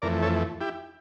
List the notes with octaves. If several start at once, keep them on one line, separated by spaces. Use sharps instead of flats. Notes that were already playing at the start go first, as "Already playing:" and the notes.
F2 E3 A3 A#4 D5
A4 C#5
E4 G4